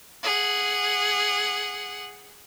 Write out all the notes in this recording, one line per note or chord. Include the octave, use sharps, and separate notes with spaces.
G#4 F#5